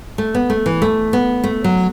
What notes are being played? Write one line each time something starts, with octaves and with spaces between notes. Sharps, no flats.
A3
B3
A3
E3
A3
B3
A3
F#3